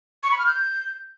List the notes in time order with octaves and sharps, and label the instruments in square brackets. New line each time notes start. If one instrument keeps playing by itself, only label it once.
[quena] C#6
B5
F6
G6